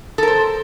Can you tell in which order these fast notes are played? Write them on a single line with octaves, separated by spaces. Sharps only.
A4 A#4 C5